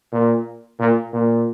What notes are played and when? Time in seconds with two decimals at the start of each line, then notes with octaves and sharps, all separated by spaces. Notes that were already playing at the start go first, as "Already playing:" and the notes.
0.12 A#2
0.79 A#2
1.13 A#2